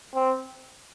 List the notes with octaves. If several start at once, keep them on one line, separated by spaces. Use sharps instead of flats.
C4